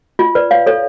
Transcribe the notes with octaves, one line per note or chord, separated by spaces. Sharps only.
F4
B4 D5
C#5 F5
A4 C#5